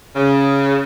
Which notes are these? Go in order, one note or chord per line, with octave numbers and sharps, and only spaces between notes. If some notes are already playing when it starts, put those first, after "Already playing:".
C#3